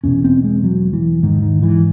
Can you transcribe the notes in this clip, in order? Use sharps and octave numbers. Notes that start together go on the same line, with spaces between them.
E2 B2 C#4
C4
G#3
F#3
E3
G#2 D#3
D#3
E3